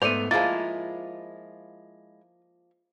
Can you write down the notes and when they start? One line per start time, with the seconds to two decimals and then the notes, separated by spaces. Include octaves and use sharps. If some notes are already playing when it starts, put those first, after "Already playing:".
0.02 G#2 A3 B3 C5 D5 D#7 F7
0.31 F3 G#3 A#3 E4 F4 A6